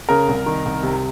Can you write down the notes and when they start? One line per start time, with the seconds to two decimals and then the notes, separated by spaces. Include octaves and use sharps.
0.09 C#3 A#4
0.28 C2
0.46 D#3
0.65 C2
0.83 C3